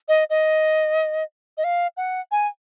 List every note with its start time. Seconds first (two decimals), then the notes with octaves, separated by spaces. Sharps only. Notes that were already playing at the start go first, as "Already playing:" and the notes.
0.08 D#5
0.30 D#5
1.57 D#5
1.64 F5
1.97 F#5
2.32 G#5